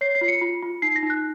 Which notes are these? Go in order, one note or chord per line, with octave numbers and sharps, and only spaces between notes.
C#5 C7
C7
F4
C#7
F4
F4
D#4 C7
A#6
D#4
F#6